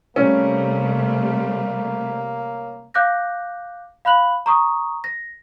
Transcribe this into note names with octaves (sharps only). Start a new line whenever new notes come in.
C3 G3 A3 A#3 C#4
F5 D6 F#6 G6 A#6
F5 B5 F#6 F#7
A#5 C#6 D#6
A#6